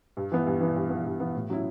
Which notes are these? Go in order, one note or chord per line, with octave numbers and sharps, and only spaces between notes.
G2
E3 B3
G2
E3 B3
G2
E3 B3
G2
E3 B3
A2
F#3 C#4 E4